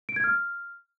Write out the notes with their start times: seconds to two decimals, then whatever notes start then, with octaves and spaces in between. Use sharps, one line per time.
0.09 D7
0.16 G#6
0.24 F6